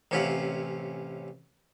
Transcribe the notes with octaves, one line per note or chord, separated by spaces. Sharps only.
A1 C3 C#4 E4 F4 F#5